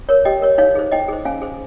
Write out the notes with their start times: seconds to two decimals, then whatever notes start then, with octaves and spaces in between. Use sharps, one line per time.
0.09 A#4 C#5
0.25 G4 D#5 G5
0.42 A#4 C#5
0.58 D#4 C#5 F5
0.75 G#4 C5
0.91 D#4 D#5 G5
1.08 G#4 C5
1.25 C#4 F5 G#5
1.42 G#4 C5